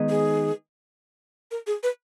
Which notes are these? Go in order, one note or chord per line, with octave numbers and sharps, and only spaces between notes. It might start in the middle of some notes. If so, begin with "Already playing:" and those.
Already playing: D#3 G#3 B3 D#4
G#4
A#4
G#4
B4